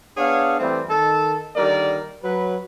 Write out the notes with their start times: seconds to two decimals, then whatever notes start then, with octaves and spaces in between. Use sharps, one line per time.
0.17 B3 D4 G#4 C#5 F5 F#5
0.59 E3 G3 A3 C4
0.89 D#3 A4 A5
1.55 D3 D#3 G3 A#3 A#4 D5
2.23 F#3 B4